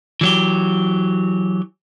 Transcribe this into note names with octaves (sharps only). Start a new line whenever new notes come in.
E3 F#3 G4